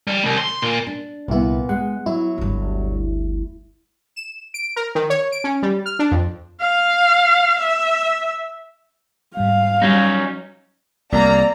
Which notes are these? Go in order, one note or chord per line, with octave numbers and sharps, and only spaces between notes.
G3
C2
C6
A#2
D4
C2 A#2 B3 E4
G#3 F#5
F#3 E4
G1 D2
E7
D7
A#4
D#3
C#5
D7
C#4
G3
F6
D4
F2
F5
E5
G#2 G3 F5
F#3 G3 C#4 D#4
C2 A#3 D5 A#5